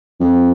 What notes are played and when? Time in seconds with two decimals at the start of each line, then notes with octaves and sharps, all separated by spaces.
0.20 F2